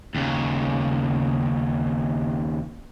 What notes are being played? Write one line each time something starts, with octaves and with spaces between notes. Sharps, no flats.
D#2 C#3